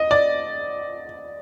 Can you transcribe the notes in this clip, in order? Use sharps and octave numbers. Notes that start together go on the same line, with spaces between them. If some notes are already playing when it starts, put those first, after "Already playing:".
Already playing: D#5
D5